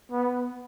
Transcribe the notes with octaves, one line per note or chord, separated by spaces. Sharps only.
B3